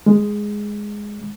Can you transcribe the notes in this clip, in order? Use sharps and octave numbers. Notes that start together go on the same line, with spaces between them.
G#3